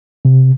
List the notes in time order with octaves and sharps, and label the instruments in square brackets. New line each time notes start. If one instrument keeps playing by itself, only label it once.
[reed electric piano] C3